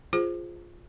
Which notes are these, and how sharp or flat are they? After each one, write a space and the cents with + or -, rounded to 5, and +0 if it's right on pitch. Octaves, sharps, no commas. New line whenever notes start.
F4 +0 G#4 +0 C5 +0